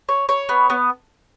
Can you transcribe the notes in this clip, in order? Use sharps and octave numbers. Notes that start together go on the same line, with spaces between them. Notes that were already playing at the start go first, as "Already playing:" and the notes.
C#5
C#5
B3
B3